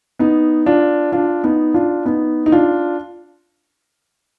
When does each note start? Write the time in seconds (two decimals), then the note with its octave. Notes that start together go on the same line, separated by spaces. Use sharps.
0.19 B3 D#4
0.66 D4 F4
1.12 D4 F4
1.44 B3 D#4
1.74 D4 F4
2.05 B3 D#4
2.46 D#4
2.52 D4 F4